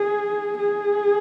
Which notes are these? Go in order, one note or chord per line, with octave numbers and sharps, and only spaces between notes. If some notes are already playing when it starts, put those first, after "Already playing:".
Already playing: G#4
G#4